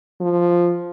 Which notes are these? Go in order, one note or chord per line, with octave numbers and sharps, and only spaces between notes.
F3